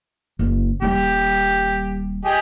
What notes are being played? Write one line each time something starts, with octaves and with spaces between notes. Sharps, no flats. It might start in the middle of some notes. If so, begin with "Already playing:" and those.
F#1
D#1 G3 G4
G4 G#4 D#5